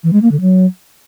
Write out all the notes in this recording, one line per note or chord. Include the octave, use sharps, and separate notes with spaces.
E3
G#3
A#3
D3
F#3